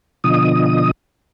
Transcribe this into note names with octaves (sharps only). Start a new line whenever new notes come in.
B2 D3 F3 D#5 D#6